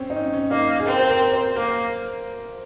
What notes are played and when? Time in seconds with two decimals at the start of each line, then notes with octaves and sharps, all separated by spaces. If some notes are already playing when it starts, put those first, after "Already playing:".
Already playing: C4 C#4
0.10 D#4
0.16 C#4
0.33 C#4
0.51 A#3 D#4
0.80 G#4
0.86 C4 A#4
0.99 C5
1.10 A#4
1.33 C5
1.56 A#3 A#4